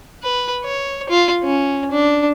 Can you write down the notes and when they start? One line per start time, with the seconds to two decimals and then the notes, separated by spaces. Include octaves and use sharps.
0.23 B4
0.65 C#5
1.09 F4
1.44 C#4
1.91 D4